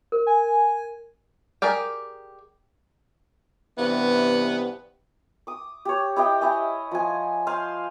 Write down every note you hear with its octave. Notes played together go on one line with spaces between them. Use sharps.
A#4
G#5
G4 G#4 A#4 D5 G5
G2 C3 E3 B3
D6 D#6
G4 C#5
E4 G4 D#5 G5
E4 D#5 G#5
F3 G#5
C5 F5 G#5 C6